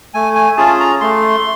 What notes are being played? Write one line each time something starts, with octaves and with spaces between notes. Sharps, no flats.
A3 G#5
G#5
C#4 F4 G#4 A5
A#5
A3 C6